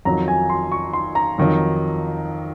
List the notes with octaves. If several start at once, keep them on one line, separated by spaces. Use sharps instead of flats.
F2 D#3 F#3 A#5
G#5
C6
C#6
C6
A#5
F2 D#3 F#3